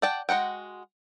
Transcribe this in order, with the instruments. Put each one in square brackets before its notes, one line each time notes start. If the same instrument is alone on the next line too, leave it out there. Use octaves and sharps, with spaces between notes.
[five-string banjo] D5 F#5 G5 A5
G#3 F#4 F#5 G5